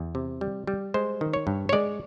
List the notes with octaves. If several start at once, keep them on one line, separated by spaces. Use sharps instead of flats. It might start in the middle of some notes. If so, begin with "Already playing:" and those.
Already playing: E2
C3
G3
G3
G#3 C5
D#3
C#5
G2
C#5
G#3 D5